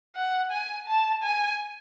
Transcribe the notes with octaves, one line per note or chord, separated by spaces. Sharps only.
F#5
G#5
A5
G#5